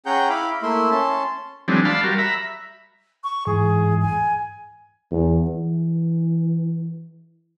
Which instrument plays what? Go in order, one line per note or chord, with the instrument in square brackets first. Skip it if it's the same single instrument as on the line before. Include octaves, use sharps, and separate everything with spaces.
[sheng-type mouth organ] C#4 G#4 F#5 G5 A#5 G6
E4 F5 B5 D6
A3 A#3 E4 E5 C6
C#4 A5 C6
[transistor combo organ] E3 F#3 G#3 C4 D4
D5 F5 A5 B5 C6
G3 F#4 A#4
E5 A#5 B5
[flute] C#6
[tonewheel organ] G#2 E3 [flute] G#4
[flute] G#5
[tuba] E2
E3